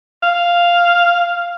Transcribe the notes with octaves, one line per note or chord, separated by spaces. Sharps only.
F5